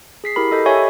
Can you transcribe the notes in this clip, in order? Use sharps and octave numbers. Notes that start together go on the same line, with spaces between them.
G#4 B6 C7
E4 G4 A#4 B5
A4 D#5 B5 G6
G4 C#5 E5 G#5 C#6